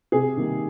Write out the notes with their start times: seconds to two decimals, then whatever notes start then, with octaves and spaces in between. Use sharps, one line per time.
0.12 C3 G#4
0.37 D#3 G3 A#3